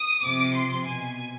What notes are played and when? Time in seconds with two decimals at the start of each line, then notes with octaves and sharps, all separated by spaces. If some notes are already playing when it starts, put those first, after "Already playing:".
Already playing: D#6
0.23 C3 F3 D6
0.56 C6
0.86 B2 G#5